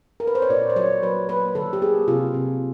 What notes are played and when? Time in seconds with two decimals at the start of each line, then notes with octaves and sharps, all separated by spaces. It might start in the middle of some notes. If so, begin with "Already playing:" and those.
0.20 A#4
0.27 B4
0.35 C5
0.42 C#5
0.50 A#2 D5
0.70 C5
0.76 F#3 C#5
1.02 F#3 B4
1.29 A#3 B4
1.55 D3 A4
1.73 G4
1.82 A#3 G#4
2.08 C3 F4
2.34 C3